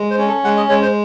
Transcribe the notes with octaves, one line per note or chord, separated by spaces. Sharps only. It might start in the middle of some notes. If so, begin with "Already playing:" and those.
Already playing: G#3
C5
C#4
A4
G#3 F#5
D#5
G#3 C#5
C5